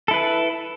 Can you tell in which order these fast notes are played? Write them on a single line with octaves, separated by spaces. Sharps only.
A4 E4 B4